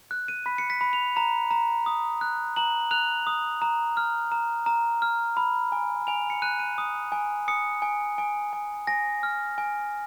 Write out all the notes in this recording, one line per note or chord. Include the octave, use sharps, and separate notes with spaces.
F#6
D#7
B5 B6
C#7
B6
B5
F7
A#5 F7
A#5
D#6
F#6
A#5 F#7
F#6 F7
D#6
A#5
F6
A#5
A#5
F6
B5
G#5
G#5 F7
C#7
F#6 D#7
D#7
D#6
G#5
D#6 C#7
G#5
G#5
G#5
G#5 A#6
F6
G#5